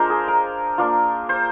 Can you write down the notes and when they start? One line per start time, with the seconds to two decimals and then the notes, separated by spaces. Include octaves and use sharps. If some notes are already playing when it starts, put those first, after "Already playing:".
Already playing: G#3 D4 F4 A#4 C5
0.10 G#4
0.28 A#4
0.78 A#3 D4 F4
1.29 C5